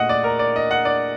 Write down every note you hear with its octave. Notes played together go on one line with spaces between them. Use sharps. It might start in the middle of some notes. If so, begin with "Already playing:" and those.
Already playing: A#2 A3 D#5 F#5
D5
A#4
D5
D#5
F#5
D5